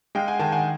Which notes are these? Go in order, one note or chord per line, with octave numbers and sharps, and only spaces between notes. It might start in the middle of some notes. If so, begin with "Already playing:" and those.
G#3 F5 G5
F#5 G#5
D#3 G5 A5
F#5 G#5